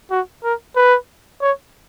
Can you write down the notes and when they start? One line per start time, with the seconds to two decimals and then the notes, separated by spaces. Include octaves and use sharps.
0.11 F#4
0.44 A#4
0.76 B4
1.42 C#5